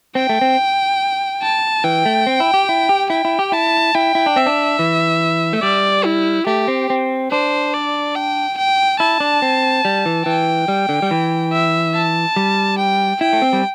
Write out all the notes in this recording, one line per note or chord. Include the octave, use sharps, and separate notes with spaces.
C4 G5
A3
C4
A5
E3 G5
A3
C4
E4
G4
E4
G4
E4 G5
E4
G4
E4 A5
E4 G5
E4
D4
C4 E5
D4
E3
A3
G3 D5
E4
A3 G4
C4
C4
D4 C5
D5
G5
G5
E4 A5
D4
C4
G3
E3
E3 G5
G3
D3
G3
E3
E5
A5
G3
G5
E4 G5
A3
C4
G3